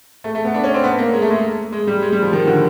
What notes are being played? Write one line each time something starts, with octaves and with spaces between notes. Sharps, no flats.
A3
A3
B3
D4
C#4
C4
B3
A#3
G#3
A3
G#3
G#3
G3
G#3
G3
F3
D#3
D3